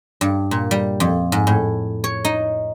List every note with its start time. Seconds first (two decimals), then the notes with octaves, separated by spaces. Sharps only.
0.21 G2
0.51 A#2
0.71 G3
1.00 F2
1.32 G#2
1.47 A2
2.04 C#5
2.25 D#4